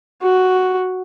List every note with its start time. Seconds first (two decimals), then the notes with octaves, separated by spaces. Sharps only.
0.22 F#4